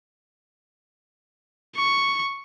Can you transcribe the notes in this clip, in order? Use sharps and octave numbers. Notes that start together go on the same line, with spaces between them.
C#6